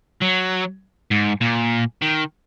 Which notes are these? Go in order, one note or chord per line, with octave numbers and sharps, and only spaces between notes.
F#3
G#2
A#2
D#3